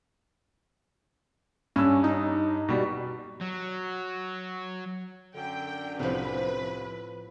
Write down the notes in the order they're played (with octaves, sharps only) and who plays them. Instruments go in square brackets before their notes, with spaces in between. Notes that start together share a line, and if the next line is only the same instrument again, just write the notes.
[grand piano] G2 E6 [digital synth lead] C#4
[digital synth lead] D#4
[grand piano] B2 G3
[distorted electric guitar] F#3
[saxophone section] F#2 D3 [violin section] G5
[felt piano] C2 C3 [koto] A2 F3 [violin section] B4